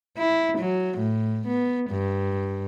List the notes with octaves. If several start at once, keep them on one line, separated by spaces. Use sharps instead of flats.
E4
F#3
A2
B3
G2